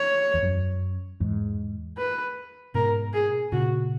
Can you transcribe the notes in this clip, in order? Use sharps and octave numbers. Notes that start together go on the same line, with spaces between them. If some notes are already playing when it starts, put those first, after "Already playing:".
Already playing: C#5
E2
F#2
E2 G#2
B4
G#2 B2 A#4
G#4
A#2 C#3 F#4